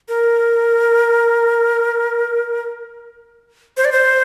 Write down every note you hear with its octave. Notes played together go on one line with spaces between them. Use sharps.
A#4
C5
D5
C5